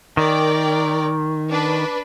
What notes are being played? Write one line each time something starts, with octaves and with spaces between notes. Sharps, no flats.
D#3 A#4 D5 G5
D4 B4